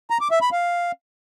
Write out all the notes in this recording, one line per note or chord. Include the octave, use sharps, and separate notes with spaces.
A#5
D6
E5
B5
F5